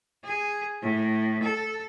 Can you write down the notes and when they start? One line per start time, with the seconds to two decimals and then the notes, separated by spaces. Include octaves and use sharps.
0.25 G#4
0.82 A2
1.43 A4